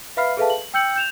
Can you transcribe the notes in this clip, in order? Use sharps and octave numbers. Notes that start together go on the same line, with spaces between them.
B4 E5 F5 B5 F6 C7
G#4 A4 B4 E5 F5 A5
F#7
G5 E6 G6 C#7 F#7
G6 E7 F7